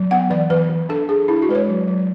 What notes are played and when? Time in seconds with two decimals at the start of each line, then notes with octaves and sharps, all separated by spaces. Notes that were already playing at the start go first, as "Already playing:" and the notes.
Already playing: F#3
0.11 B3 F#5
0.30 E3 D5
0.50 E3 B4
0.70 E3
0.89 D4 A4
1.09 D4 G#4
1.28 D4 E4
1.42 F#4
1.49 G#3 B4
1.55 C#5
1.69 F#3
1.88 F#3